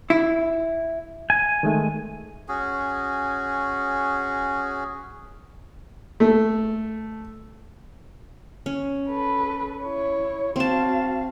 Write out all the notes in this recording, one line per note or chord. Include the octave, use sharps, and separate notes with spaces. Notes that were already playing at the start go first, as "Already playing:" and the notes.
E4
G#5
D#3 G#3 A3
C#4 F#4 G#4
A3
C#4
A4 B4
E4 C#5
C4 F#4 F5 A5